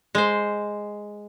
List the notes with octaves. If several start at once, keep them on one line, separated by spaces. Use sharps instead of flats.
G#3 C5